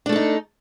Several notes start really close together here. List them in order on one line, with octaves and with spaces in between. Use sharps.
D4 A3 A4 D#4